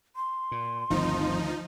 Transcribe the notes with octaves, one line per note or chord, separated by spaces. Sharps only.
C6
A#2
G1 D2 C3 D#3 F3 C4 D#4